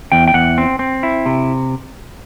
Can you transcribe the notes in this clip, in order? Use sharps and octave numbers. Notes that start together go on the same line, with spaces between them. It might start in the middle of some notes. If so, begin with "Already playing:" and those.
E2 G5
G5
E2 F#5
C4
C4
E4
C3